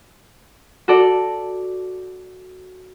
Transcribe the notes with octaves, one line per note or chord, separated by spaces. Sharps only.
F#4 A4 D5